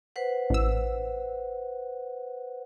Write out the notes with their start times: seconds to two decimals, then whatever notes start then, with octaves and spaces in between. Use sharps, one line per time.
0.16 B4 C5 F#5
0.50 A1 E6